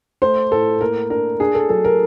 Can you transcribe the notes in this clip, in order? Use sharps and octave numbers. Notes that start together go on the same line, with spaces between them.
A3 C5
A2 A4
A#3 A#4
D4 A#4
D4 G#4
A4
F#3 A4
A#4